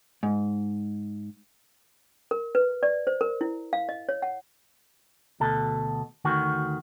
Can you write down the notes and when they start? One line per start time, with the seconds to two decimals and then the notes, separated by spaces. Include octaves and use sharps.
0.23 G#2
2.31 A#4
2.55 B4
2.83 D5
3.07 C5
3.21 A#4
3.41 E4
3.73 F5
3.89 D#5
4.09 C#5
4.22 F#5
5.40 D2 B2 A4
6.25 D2 D#3 F#4